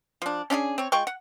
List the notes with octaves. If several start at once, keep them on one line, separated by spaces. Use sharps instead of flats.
F3 D4
C#4 D4 F4 G#4
C4 C#5
G#3 F4 G5 C#6
F#5